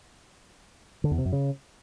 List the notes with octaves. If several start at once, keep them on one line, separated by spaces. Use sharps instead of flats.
D3
E2
C3
F#2
C#3